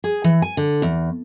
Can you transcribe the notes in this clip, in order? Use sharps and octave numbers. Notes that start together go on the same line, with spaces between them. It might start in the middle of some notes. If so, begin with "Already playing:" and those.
G#4
E3
G#5
D3
E2